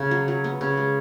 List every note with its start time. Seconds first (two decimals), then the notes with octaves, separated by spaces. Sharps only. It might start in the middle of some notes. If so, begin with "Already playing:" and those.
Already playing: C#3
0.11 F#3
0.28 F#3
0.44 B3
0.61 C#3
0.77 G#3